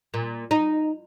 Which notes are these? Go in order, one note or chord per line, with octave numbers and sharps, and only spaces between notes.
A#2
D#4